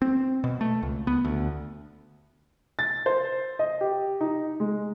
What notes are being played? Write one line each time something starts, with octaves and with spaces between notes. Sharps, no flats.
C4
B2
A3
C#2
B3
D2
A6
C5
D#5
G4
D#4
G#3